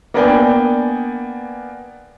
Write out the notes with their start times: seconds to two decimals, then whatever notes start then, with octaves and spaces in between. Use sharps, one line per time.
0.14 A#3 B3 D4 D5 G5 G#5